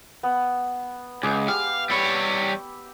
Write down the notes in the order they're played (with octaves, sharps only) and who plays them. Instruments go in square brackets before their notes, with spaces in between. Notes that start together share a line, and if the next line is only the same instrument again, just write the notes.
[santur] B3
[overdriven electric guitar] C#2 [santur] G#3 G#5 D6
[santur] G4 [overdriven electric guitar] F5
[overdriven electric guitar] G3 C#5 [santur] E5 B5 E6